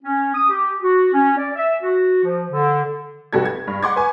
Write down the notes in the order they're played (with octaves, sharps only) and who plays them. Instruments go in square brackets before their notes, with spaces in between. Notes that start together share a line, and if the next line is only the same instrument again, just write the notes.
[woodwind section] C#4
D#6
G4
F#4
C#4
D5
E5
F#4
F3
D3
[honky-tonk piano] F1 G3 F#4 A4 G#6
G#6
G2
F#5 C6 D6 G#6
B4 G#5 C#6